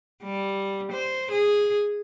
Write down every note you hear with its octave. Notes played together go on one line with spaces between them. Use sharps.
G3
C5
G#4